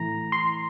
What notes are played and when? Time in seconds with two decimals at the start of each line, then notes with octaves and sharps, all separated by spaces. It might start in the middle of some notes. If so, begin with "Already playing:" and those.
Already playing: A2 E3 A#5
0.32 C6